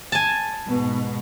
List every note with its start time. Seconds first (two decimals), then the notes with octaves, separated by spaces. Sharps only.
0.12 G#5 A5
0.65 G#2 B2